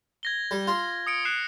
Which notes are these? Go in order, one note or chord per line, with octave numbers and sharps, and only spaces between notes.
G#6 A#6 G7
G3
F4
D#6 C#7 D7
F#6 C7 E7